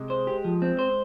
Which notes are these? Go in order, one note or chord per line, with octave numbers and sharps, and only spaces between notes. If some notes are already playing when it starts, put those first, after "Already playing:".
Already playing: C3 G#3
C5
G4
F3
C4
C5